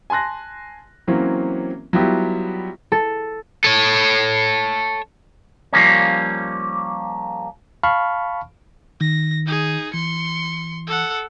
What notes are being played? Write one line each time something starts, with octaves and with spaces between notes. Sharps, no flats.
G#5 A5 C6 F#6 A#6
E3 F#3 A#3 C4 C#4
F#3 G3 B3 E4 F4 G4
A4
A4 C#5
F3 G3 A#3 C#4
F5 A5 B5 C#6 F6
D#3 A#6
D#4 G#4
E3 C6 C#7
A4 F#5